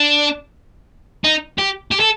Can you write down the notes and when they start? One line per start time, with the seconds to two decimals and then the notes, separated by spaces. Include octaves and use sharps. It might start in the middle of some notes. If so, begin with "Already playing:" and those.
Already playing: D4
1.24 D#4
1.58 G4
1.91 G4
2.00 A4